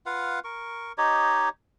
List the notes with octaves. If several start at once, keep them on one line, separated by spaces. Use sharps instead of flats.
F4 B4 F5 F#5
A#4 C#6
D#4 G4 C#5 D#5